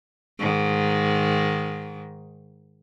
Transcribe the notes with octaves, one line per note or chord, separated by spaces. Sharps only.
G#2 D#3